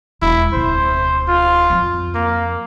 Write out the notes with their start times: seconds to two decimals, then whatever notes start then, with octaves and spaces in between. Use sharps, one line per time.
0.22 E1 E4
0.54 D1 B2 C5
1.29 F4
1.70 F2
2.15 A#3